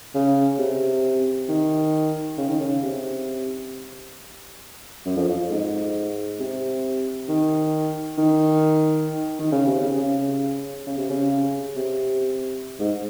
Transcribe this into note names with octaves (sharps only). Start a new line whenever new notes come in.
C#3
C3
D#3
C#3
D#3
C#3
C3
F#2
F2
F2
G#2
C3
D#3
D#3
D#3
C#3
C3
C#3
C#3
C#3
C3
C#3
C3
G#2